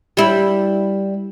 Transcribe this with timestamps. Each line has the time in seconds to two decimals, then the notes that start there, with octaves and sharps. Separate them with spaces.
0.17 G3 E4